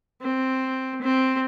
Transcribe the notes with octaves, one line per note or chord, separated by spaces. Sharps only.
C4
C4